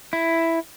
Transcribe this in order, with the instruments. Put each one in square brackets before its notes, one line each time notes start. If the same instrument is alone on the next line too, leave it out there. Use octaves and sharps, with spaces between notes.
[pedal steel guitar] E4